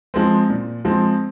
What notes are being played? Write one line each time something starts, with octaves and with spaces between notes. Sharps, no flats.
F3 G#3 C4
A#2
F3 G#3 C4